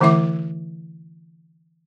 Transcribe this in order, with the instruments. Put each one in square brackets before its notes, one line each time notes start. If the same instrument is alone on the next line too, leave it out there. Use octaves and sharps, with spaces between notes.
[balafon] D3 E3 A3 E4 E5 D6